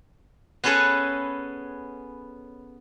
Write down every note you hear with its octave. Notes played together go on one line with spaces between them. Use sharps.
B3 C#4 G#4 A4 B4 C#5